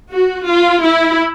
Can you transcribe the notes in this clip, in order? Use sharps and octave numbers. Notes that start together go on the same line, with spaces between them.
F#4
F4
E4